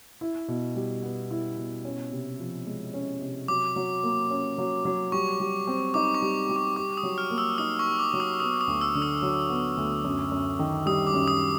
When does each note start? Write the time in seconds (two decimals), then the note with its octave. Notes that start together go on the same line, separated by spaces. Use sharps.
0.21 E4
0.48 B2
0.75 G3
1.03 B3
1.31 E4
1.57 B2
1.85 C#4
2.12 C3
2.40 F3
2.66 G#3
2.94 C#4
3.21 C3
3.48 F#3 D6
3.76 F#3
4.03 A#3
4.31 C#4
4.58 F#3
4.85 F#3
5.12 G3 C#6
5.40 G3
5.67 C4
5.94 D#4 D6
6.14 C#6
6.22 G3
6.49 G3
6.56 C#6
6.76 G4 D6
6.97 D#6
7.03 F#3
7.18 F6
7.31 A#3
7.38 E6
7.58 D#4 D#6
7.79 C#6
7.86 G4
7.99 D6
8.13 F#3
8.20 D#6
8.40 B3 D#6
8.61 D#6
8.67 D2
8.81 E6
8.95 D3
9.02 D#6
9.22 F#3
9.50 B3
9.77 D2
10.04 F#2
10.31 F#2
10.59 D#3
10.86 G3 D#6
11.07 D6
11.14 F#2
11.28 D#6